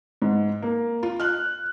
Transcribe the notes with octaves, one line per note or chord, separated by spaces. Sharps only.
G#2
A#3
F4
F6 F#6